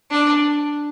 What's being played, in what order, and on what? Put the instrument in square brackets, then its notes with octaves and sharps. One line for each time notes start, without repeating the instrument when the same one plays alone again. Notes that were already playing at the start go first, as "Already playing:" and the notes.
[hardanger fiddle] D4